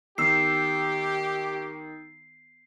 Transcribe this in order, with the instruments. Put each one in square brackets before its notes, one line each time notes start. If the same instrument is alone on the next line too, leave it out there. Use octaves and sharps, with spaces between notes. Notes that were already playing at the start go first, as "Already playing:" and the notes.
[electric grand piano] D#3 E6 [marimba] B3 [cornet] G4 [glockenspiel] C7